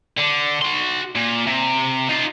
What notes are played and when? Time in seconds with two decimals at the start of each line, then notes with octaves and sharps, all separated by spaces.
0.17 D3
0.62 F#4 C6
1.15 A#2
1.47 C3
2.09 D#4 F4